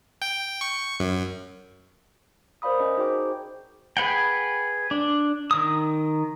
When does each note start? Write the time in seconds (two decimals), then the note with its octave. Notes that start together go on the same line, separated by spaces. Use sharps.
0.22 G5
0.61 C#6
1.00 F#2
2.62 A#4 C5 D5 F5 B5 D#6
2.80 C#4 D#5
2.97 D#4 F#4 G#4 C5 G5 D6
3.97 G#4 B4 F#5 G5
4.91 D4
5.51 D#3 D#6